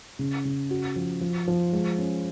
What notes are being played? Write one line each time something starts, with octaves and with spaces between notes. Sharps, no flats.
C#3
C#3
F#4
F3
F3
F3
G#3
C#4